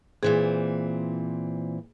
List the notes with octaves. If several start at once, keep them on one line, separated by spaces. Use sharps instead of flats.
A#2 E3 C4 G#4